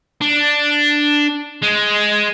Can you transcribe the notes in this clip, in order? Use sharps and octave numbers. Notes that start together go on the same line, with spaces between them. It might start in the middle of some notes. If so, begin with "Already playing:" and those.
D4
G#3